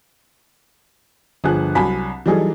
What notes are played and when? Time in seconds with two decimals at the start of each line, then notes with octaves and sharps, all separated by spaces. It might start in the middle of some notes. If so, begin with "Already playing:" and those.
1.44 G1 F3 G#4 F#6
1.75 C2 F#3 G#5 A5 B5 B6
2.26 E3 F#3 G3 D#4 G#4 A4